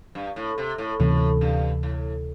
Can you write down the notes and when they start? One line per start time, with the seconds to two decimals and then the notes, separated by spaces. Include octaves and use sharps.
0.15 G2
0.36 A2
0.58 C3
0.78 A2
1.00 D2 A2 C3 E3
1.41 G2
1.83 A2